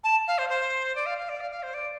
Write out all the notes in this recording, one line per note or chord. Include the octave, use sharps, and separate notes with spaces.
A5
F5
C5
C5
D5
F5
F5
D5
F5
F5
C5
D5